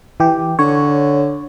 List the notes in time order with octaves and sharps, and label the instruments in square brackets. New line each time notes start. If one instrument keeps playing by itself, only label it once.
[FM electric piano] E3 G4
[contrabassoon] D3 [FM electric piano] C#5